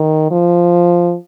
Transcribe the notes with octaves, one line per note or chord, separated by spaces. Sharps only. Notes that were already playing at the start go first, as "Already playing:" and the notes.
Already playing: D#3
F3